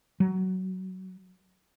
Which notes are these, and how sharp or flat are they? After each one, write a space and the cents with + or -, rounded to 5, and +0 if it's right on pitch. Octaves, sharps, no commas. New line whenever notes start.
F#3 +15